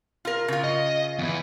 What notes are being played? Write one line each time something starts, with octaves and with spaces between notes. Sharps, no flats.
F4 A#4
C#3 F4
D#5
E2 E3